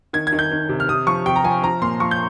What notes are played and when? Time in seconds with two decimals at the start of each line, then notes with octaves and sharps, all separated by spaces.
0.13 D#3 G#6
0.27 G#6
0.33 D#3
0.39 G6
0.51 D#3
0.69 C3
0.80 F6
0.89 C3 D#6
1.07 F3 C#6
1.26 C3 G5
1.36 A#5
1.44 F3 G#5
1.63 F3 A#5
1.82 A#2 C6
2.00 F3 C#6
2.11 G6